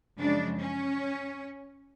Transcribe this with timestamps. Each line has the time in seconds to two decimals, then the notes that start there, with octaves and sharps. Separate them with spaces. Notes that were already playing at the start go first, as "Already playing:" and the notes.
0.19 F#2 C#3 F3 G#3 D4
0.59 C#4